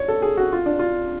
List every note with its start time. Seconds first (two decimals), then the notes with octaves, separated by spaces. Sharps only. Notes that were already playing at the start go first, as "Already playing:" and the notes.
Already playing: C#5 D5
0.08 A4
0.22 G#4
0.37 F#4
0.52 F4
0.66 D4
0.79 F4